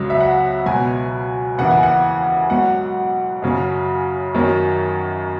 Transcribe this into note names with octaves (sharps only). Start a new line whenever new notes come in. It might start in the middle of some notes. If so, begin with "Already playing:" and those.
Already playing: C#2 C#3 F#3
E5
F#5
C#2 B2 F#3 G#5
D#2 C#3 E3 F#5
G#5
F#5
G#2 F#3 F#5
F#2 C#3 F#3
F#2 D#3 F#3